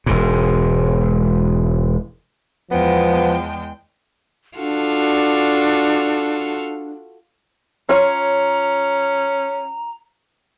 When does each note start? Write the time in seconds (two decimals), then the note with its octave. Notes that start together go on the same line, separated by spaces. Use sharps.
0.06 E1 G#2
2.71 E2 F3 G#3 B3 G5
4.58 D4 F4 F#4 A4
7.89 C#4 F4 C#5 A#5